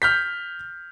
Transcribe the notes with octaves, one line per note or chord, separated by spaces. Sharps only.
F6 G6 B6